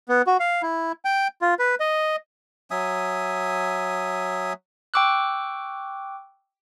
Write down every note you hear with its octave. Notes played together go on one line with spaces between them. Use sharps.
B3
F#4
F5
E4
G5
F4
B4
D#5
F#3 E5 G#5 D#6
G5 C#6 D6 E6 F#6